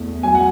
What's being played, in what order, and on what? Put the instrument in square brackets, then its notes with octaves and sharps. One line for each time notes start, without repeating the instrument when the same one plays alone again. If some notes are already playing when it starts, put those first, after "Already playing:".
Already playing: [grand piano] E2 A3
F#3 G#5
F#5